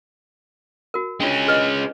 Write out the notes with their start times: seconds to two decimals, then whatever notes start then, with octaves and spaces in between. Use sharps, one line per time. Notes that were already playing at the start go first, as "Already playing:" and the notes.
0.94 F#4 A#4
1.20 G#3 C#4 D4 F4
1.47 G#4 B4 D#5